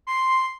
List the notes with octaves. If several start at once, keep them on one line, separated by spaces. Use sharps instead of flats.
C6